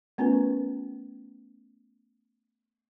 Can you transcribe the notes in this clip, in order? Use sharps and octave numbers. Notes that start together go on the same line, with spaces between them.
A3 B3 C#4 F4 A#4 B4